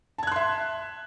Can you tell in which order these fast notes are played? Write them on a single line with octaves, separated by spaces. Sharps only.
A5 G#6 F#6 C6 E5